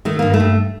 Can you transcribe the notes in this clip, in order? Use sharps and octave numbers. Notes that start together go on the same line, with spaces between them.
D#3 A3
G2 A#3
A3
G2